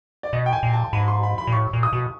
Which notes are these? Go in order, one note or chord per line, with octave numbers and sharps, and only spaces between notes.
D5
B2 D#5
G5
G#5
A#2
A5
G#2 B5
C6
B5
B5
A#2
A2 C#6
A#2
D#6
B2